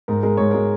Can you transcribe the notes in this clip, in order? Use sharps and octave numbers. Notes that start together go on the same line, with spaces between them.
G#2 A#4
G#3 A#4
G#2 C#5
G#3 A#4